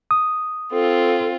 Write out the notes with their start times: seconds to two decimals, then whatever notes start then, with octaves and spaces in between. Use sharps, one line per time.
0.11 D#6
0.72 C4 F4 A4